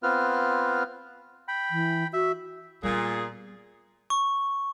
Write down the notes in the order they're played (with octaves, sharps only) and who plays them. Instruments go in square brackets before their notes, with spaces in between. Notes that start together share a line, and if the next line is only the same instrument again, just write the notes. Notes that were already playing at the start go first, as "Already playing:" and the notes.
[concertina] B3 C4 F4 B4 F6
G5 B5
[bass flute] E3
[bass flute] F#4 [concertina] E5
[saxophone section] A#2 [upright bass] G3 B3 [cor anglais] G#4
[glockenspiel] C#6